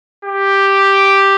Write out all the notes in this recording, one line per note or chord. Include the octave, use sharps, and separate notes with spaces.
G4